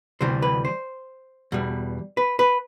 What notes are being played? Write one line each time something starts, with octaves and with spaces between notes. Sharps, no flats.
D2 C3 E3 G3 C5
B4
C5
E2 B2 G3
B4
B4